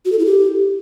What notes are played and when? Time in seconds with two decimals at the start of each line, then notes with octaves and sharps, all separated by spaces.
0.05 F#4
0.12 A4
0.19 E4
0.26 G4